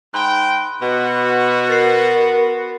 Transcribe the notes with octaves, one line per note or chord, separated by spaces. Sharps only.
G#2 G5 B5 C6 F#6
B2 B3 F#4
A#4 A6 C7